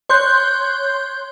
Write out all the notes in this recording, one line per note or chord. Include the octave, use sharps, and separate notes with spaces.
C#5 C6 F#6 G6